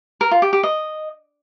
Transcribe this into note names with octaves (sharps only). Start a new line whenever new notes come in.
A#4
F4
G4
G4
D#5